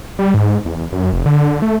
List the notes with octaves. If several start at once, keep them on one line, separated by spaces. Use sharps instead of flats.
G3
G#2
E2
F#2
F1
D3
A3